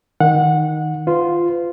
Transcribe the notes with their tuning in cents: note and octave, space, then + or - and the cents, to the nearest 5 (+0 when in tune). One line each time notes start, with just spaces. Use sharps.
D#3 +0 F#5 -20
F4 -10 B4 +45 C6 +0